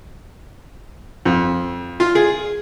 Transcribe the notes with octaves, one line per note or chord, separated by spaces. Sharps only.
F2
F4
G#4